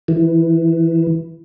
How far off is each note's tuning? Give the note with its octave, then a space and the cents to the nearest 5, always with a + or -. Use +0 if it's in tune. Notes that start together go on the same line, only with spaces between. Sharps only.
E3 +5